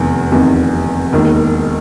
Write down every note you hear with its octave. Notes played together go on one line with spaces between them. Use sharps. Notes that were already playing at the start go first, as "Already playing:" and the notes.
Already playing: F1 E2 C3 D#3
F1 E2 C3 D#3
E1 D#2 D#3